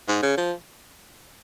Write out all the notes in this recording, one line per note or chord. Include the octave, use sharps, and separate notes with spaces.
G#2
C#3
F3